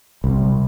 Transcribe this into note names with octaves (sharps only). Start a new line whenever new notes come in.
C2